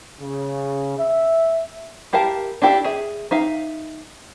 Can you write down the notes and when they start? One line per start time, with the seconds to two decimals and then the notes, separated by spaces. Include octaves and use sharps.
0.20 C#3
0.99 E5
2.13 E4 G4 A#4 F5 A5
2.62 D4 E4 G4 A4 F5
2.85 G#4 E5
3.31 D#4 E5 F5